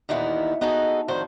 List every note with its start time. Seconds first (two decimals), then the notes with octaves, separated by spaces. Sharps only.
0.09 D#2 A#2 D#3 E3 B3
0.61 B3 D#4 F#4 G#4 A4
1.08 F2 A2 D3 D#3 F#4 C5